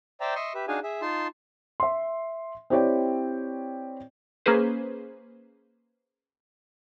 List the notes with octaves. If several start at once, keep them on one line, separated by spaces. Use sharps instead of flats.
C5 D5 E5 G5 A#5
D#5 E5 C6 C#6 D#6
G4 B4 E5
D4 D#4 F#4 G#4 F5 G#5
G#4 E5
D#4 F4 A5 C6
E5 C6
C4 E4 G4 C#5 D5 G5
A#3 C#4 G#4 B4 C5